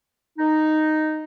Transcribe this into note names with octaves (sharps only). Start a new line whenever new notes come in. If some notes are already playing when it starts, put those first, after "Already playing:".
D#4